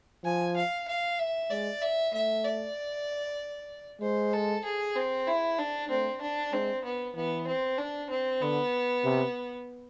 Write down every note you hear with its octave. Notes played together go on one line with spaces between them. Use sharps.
F3 G#5
F5
F5
E5
G#3 D5
E5
A3 E5
D5
G#3 C5
A4
G#4
C4
E4
D4
A3 C4
D4
G#3 C4
B3
E3 B3
C4
D4
C4
D3 B3
C3